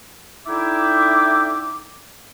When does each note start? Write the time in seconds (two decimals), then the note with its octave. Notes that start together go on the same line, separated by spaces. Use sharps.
0.47 D3 D#4 E4 E5 G5 D6